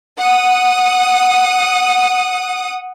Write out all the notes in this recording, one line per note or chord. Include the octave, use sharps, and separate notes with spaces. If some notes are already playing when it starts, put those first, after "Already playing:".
F#5 D#6